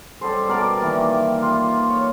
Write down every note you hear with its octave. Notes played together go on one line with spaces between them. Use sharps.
G3 A4 C5
B2 A#4 D5 A5
D#3 E3 A#3
F4
C#5